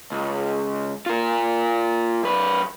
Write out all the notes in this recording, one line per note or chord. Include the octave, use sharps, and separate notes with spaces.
C#2
F4 A#4
F#2 B4